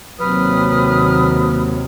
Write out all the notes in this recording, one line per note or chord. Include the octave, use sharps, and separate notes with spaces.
D#2 C3 F#3 B4 D#6 F6